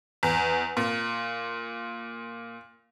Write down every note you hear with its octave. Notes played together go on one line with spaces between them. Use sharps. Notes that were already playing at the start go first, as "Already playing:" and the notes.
E2
A#2